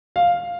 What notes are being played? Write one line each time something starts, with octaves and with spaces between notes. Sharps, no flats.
F5